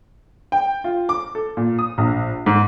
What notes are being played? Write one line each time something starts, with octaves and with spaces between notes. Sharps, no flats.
G5
F4
D6
A4
A#2
D#6
A#1
G#2